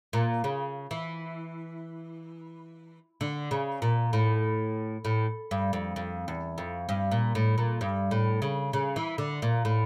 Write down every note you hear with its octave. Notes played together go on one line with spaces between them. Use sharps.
A#2
C#3
E3
D3
C#3
A#2
A2
A2
G2
F2
F2
E2
F2
G2
A#2
A2
A#2
G2
A2
C#3
C#3
E3
D3
A#2
A2